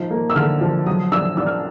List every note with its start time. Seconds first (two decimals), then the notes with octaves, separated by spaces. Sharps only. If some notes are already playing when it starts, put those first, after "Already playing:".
Already playing: F3 D#4
0.10 A#3
0.30 E6
0.35 D3 F6
0.61 F3
0.86 F#3 D#6
1.12 D4 E6
1.37 D4 E6
1.46 F6